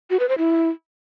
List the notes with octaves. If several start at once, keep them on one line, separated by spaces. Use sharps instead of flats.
F#4
B4
C5
E4